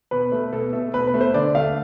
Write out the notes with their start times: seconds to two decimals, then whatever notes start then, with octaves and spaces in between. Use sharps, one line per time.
0.11 B2 B4
0.32 A3
0.53 B2 A4
0.73 A3 A4
0.93 B2 B4
1.07 B4
1.14 A3
1.21 C5
1.34 D3 D5
1.55 A3 F5